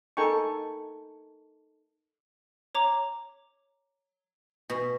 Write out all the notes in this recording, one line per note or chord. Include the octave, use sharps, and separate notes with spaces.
D#4 A4 A#4 G5 G#5 C#6
C#5 A#5 D6
B2